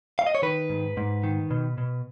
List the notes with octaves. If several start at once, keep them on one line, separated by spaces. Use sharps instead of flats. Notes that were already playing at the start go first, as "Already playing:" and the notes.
F5
D#5
C#5
D#3 B4
G#2
G#2
D#3
B2
B2